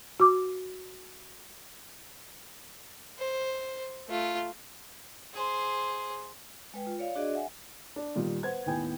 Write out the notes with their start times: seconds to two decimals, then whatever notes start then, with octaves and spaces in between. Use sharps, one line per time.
0.20 F#4 D6
3.18 C5
4.08 A3 F4
5.33 G#4 C5
6.74 G#3 B4 G5
6.87 F4
6.99 C#5 D5 F5
7.15 D4 F#4 G#4 D5 D#5
7.33 E5 F#5 G#5
7.96 D4
8.15 A#2 D#3 G3 D#4
8.43 B4 C5 F#5 G#6
8.66 D#2 A2 B3 G5 G#5